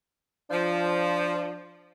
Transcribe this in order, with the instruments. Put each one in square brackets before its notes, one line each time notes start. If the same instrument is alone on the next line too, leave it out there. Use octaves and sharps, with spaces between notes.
[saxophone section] F3 [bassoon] D4